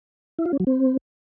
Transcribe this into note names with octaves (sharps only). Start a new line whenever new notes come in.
E4
F4
C#4
F#3
C4